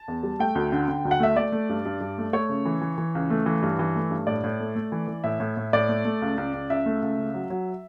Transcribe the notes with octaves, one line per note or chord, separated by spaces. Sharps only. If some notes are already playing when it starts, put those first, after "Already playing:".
Already playing: A5
E2
G3
A3 G5
D2
D3
D3
D2
F#5
A3 E5
A3 D5
A3
G2
G2
G2
A3
A3 C#5
C#3
E3
E3
E3
C#2
A3
E3
G2
E3
A3
G2
A2 D5
A2
A3
A3
E3
E3
A2 E5
A2
A2
A2 D5
A3
A3
C#2
C#2
C#2
C#2 E5
A3
C#2
C#3
F#3
F#3